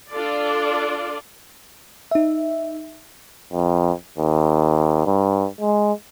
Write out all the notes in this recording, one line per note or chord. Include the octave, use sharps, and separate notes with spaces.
D4 F4 A4 D5
D#4 E5
F2
D#2
G2
G#3